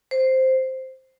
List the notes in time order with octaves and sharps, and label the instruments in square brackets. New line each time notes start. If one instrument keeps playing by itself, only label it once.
[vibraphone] C5